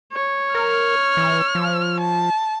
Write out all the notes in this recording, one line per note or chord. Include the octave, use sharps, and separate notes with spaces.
C#5
A#4 F6
E3
F3
A5